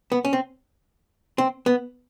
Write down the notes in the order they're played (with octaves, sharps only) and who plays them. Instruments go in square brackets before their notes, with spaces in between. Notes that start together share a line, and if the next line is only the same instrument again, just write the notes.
[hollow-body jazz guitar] B3
C#4
C4
C4
B3